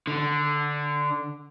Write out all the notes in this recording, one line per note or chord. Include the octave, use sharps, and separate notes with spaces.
D3